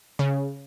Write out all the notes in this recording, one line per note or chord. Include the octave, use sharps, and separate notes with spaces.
C#3